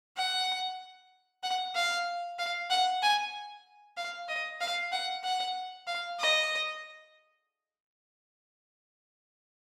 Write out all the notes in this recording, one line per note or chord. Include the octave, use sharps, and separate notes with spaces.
F#5
F#5
F5
F5
F#5
G#5
F5
D#5
F5
F#5
F#5
F5
D#5